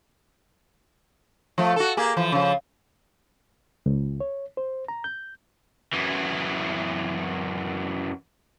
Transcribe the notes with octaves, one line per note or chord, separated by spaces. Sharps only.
F3 A3
F#4 A4
A#3 G4 G#4
E3 F3
C#3 F3
C#2
C#5
C5
A#5
G6
F#2 E3